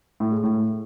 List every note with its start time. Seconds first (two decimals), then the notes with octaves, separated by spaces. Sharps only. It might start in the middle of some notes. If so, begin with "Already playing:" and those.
0.20 A2
0.32 G#3
0.43 A2